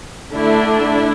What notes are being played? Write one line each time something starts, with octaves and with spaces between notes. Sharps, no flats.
D3 A3 D4 E4
E4